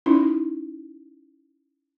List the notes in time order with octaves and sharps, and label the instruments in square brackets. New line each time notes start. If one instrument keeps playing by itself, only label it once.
[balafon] C#4 D#4 E4